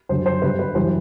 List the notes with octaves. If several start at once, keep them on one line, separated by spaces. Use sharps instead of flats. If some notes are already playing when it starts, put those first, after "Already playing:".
F#2 D3 G3 C5
C5
G2 D3 G3 B4
B4
F#2 E3 G3 C5